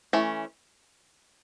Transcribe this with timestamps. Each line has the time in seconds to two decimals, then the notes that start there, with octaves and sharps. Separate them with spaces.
0.13 E3 A3 C#4